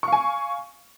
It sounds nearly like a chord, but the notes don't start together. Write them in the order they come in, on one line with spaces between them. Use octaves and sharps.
C#6 F5 G#5